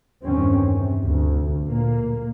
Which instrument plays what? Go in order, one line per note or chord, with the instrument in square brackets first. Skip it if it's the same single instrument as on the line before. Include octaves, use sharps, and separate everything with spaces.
[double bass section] E2 G2 D#3 C4 C#4
C3
D2
A#2 A#3